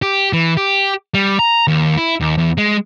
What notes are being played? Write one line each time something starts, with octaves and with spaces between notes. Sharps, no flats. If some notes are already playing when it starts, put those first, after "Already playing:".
G4
E3
G4
G3
A#5
D#2
E4
D#2
E2
G#3